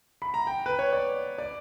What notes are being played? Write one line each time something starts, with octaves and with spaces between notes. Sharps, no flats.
B5
A#5
G5
B4
C#5
D5
D5